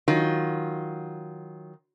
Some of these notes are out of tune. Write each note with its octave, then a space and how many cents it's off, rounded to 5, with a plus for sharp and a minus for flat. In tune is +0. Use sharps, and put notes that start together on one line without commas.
D#3 +10 F#3 +0 F4 +0